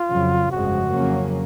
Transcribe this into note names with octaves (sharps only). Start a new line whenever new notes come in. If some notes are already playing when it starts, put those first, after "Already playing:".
Already playing: F4
F2 C#3 F#3
G1 F2 C#3 F3 G#3 F#4
F2 C#3 F#3 A#3 C#4